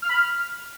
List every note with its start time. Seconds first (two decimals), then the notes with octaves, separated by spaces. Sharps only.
0.03 F6
0.10 B5
0.17 F6